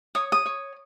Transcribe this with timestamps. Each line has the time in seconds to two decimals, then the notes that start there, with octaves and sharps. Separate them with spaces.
0.15 C#5 D#6
0.32 D#6
0.46 C#5